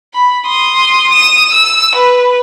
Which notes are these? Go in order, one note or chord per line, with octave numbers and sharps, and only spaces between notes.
B5
C6 D#6
D#6 E7
E6
B4